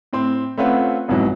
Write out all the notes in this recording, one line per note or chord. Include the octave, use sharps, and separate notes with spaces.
A2 C4 C6
A3 C4 C#4 F4 B4 F#5
C2 F2 G#2 B2 E3 F#3